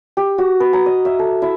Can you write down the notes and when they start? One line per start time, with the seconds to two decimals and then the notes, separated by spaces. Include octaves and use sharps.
0.17 G4
0.38 F#4
0.60 B4
0.73 A#5
0.86 D#5
1.05 E5
1.19 A4
1.42 E4